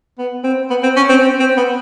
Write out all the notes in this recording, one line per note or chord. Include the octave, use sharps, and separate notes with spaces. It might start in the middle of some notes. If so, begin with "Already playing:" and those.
B3
C4
B3
C4
C#4
C4
C4
C4
B3